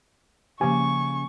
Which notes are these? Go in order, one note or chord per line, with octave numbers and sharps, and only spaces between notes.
C#3 F3 A#3 C#4 G4 G#5 C#6